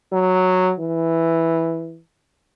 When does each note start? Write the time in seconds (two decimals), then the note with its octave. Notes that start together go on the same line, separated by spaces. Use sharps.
0.13 F#3
0.80 E3